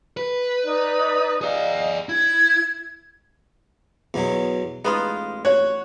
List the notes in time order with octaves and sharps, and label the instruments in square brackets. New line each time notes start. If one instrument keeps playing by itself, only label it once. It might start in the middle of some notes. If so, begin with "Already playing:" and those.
[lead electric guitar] B4
[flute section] D#4 D5
[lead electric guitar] G#4 D5 [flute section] D#5 F5
[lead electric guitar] E4 [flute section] G#6
[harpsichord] E2 B2 F#3 [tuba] B3
[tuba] A1 [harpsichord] G#3 [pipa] B3 D#4 F4
[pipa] F#4 [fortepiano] C#5